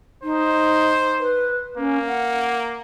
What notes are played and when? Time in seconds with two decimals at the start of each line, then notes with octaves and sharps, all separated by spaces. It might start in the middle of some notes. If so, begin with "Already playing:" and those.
0.23 D#4 C5
1.20 B4
1.78 A#3 C#4
2.07 F#5